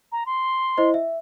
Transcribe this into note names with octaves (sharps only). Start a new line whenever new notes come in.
A#5
C6
E4 C5 D#5
E5